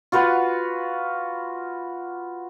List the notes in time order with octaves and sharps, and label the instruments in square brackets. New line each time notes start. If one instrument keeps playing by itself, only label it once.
[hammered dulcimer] F4 F#4 B4 F#5